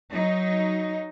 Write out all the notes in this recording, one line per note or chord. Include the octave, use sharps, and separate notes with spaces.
F#3 D#4